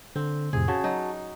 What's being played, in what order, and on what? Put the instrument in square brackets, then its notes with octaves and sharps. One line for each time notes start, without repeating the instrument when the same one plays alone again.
[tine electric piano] D3 [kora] C4
[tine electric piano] F2 A2 C3 [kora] G#4
[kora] C#3 [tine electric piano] F#4 A5
[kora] F#3 D#4